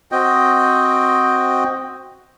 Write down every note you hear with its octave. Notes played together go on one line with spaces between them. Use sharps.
C4 F#4 D#5 G5